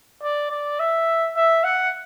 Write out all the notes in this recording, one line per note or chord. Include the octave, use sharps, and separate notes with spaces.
D5
D5
E5
E5
F#5